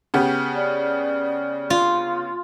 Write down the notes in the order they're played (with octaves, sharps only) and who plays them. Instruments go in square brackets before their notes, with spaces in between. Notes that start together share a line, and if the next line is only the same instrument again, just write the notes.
[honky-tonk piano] C#3 B3 G4
[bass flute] D5
[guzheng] F4